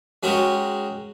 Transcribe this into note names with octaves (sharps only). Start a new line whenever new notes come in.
G#3 C#4 F#4 G4 A#4